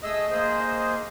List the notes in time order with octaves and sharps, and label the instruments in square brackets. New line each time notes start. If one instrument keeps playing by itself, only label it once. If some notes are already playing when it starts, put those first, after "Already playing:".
[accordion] A3 G#4 E6 [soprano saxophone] D#5
[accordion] A#3 G#4 C5
[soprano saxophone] D#5